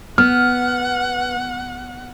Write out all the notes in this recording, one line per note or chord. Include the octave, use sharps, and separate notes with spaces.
B3 F#5 F6